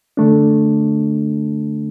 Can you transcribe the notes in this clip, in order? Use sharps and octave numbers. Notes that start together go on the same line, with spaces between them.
D3 A3 D4